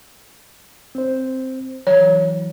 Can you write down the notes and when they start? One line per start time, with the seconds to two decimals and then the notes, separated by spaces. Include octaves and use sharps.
0.95 C4 C5
1.87 E3 F#3 C#5